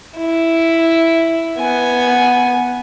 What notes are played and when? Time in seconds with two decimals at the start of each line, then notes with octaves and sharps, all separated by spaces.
0.17 E4
1.59 B3 G#5